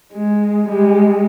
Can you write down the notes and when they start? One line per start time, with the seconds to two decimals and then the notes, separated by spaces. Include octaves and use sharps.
0.13 G#3
0.65 G3 G#3